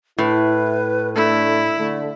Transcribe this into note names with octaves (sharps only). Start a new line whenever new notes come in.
A2 E4 B4
A3 D4 E4
D3 A3